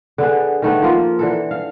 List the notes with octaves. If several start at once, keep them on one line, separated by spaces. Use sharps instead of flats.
D3 B3 G#4
D#3 A3 B3
F3 A#3 F4
D3 E3 A4
F5